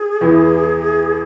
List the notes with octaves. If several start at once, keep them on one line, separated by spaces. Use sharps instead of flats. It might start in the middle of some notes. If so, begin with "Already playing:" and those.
Already playing: G#4
E2 E3 B3